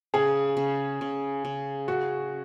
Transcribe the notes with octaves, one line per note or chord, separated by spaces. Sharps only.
C#3 G#4
C#3
C#3
C#3
C#4 F#4